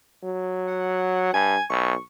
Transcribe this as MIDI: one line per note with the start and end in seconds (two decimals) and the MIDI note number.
0.24 1.33 54
0.68 1.32 78
1.33 1.56 43
1.33 1.63 80
1.70 1.94 35
1.70 2.00 85